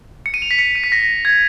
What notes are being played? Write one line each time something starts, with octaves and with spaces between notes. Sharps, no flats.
C#7
D#7
F7
B6
C#7
D#7
B6
A#6
G#6